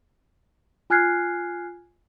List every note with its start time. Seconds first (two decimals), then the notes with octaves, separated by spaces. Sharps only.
0.90 F4 G#5 F6 F#6 G#6 C7